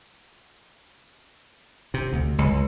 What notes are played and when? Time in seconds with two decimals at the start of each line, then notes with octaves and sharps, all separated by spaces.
1.94 C3
2.13 D2
2.38 C#2